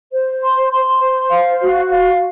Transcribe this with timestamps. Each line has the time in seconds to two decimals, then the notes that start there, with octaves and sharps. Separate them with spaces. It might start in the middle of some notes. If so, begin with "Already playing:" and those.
0.12 C5
0.42 C6
0.72 C6
1.01 C5
1.30 F5
1.61 F#4
1.91 F5